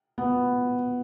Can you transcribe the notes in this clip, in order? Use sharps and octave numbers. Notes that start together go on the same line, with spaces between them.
B3